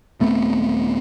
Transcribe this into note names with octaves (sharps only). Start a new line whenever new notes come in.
D#1 A3 B3 C4